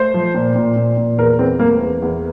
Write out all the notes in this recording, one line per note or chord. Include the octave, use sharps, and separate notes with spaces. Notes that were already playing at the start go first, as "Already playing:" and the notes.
Already playing: A3 C5
F3
A#2
A#2
A#2
A#2
E2 A#4
E2 C4
A3 A#3
E2
E2